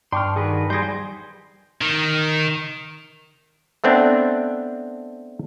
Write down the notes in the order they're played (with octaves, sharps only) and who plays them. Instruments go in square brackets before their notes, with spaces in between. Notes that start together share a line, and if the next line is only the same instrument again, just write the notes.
[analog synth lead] G2 [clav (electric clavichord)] D4 [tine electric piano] G5 [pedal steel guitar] C6 C#6 F6
[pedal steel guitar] D#3 F#4 B4 [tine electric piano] G#4
[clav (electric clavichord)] G3 G#4 [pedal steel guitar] C6 [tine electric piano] G6 A#6
[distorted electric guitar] D#3
[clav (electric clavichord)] A3 B3 C4 D4